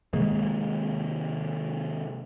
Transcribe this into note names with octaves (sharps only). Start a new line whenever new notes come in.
C3 D#3 G#3 A#3